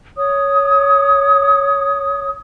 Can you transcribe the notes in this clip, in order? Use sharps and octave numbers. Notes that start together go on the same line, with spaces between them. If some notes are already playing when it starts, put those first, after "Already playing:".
C#5 D#6